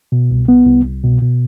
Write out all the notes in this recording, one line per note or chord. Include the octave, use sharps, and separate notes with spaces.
B2
C2
B3
C2
C2
B2
B2